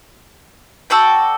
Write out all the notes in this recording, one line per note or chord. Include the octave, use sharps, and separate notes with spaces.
F#4 A4 D5 G5